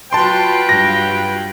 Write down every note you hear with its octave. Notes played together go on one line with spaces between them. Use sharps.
F#3 F4 B4 G5 A5 C6
G2 F#3 F4 A#6